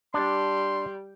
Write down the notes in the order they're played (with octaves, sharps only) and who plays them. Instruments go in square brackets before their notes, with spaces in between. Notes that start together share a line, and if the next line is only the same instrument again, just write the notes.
[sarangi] G3 [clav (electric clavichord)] D4 [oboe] C6